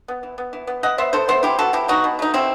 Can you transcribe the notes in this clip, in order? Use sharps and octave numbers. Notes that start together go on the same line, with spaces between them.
B3
E3
B3
E3
B3
E3 D#5 F#5
B3 C5 E5
E3 A4 C5
B3 C5 E5
E3 E4 G4
B3 F#4 A4
E3 E4 G4
B3 D#4 F#4
B2
A3 D#4
B2 C4 E4